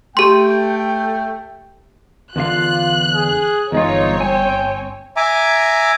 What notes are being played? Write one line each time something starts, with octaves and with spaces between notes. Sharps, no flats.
A3 G4 G5 C6
E2 D3 F4 F5 F#6
G#4
G1 E2 G#3 C4 D#4 F4 C#5
G5 G#5
E5 G#5 A#5 D6